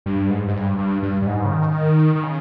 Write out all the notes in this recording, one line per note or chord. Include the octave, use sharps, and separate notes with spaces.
G2
G#2
G#2
G2
G2
G2
G2
G#2
C#3
D#3
D#3
C#3